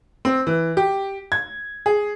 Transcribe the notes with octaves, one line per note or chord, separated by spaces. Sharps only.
C4
E3
G4
G#6
G#4